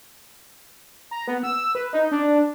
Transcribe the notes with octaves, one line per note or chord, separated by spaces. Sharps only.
A#5
B3
E6
B4
D#4
D4